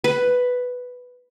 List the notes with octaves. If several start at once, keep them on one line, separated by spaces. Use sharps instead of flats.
B4